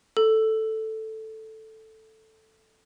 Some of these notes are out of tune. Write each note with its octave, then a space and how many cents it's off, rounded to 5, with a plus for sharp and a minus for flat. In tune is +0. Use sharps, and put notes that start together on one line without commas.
A4 +0